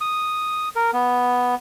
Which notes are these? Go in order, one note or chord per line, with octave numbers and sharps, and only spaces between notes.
D#6
A#4
B3